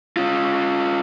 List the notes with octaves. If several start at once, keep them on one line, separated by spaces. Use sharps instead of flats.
C#4 F4